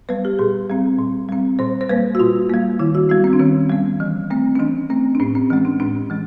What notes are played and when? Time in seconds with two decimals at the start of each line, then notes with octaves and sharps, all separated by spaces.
0.09 G3 B3 B4
0.25 G4
0.39 A#2 G#4
0.69 G3 C4
0.99 A#2
1.29 G3 C4
1.59 A#2 C5
1.81 C5
1.89 G3 A#3 B4
2.15 F#4
2.20 A#2 F4
2.50 G3 A#3
2.79 D#3 E4
2.95 F#4
3.09 G3 B3 F#4
3.24 C4
3.33 D4
3.39 D#3 C#4
3.70 G3 B3
4.00 E3
4.30 A3 C4
4.55 C#4
4.59 E3 D4
4.90 A3 C4
5.15 D4
5.20 A2 C#4
5.35 C4
5.50 E3 G#3 C#4
5.65 D4
5.80 A2 D4
6.10 E3 G#3